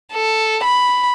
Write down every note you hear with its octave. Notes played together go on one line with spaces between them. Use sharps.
A4
B5